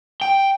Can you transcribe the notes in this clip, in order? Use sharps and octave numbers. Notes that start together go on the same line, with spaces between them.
G5